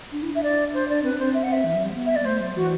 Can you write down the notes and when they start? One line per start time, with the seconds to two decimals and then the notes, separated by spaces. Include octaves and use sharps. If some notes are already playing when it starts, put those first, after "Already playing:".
0.12 D4
0.23 E4
0.33 D4 E5
0.43 D5
0.74 C5
0.89 D5
1.03 C4 B4
1.12 D4
1.19 C4 C5
1.33 E5
1.43 F#5
1.52 E5
1.64 E3
1.74 F#3
1.84 G3
1.94 B3
2.05 E5
2.15 D5
2.20 B3
2.25 A3 C5
2.40 F#3
2.55 E3 F#4